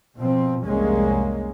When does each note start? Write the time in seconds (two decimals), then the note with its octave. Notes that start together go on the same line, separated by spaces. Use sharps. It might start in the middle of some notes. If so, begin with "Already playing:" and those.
0.16 B2 F3 C4
0.65 F1 C2 G#3 A#3 C#4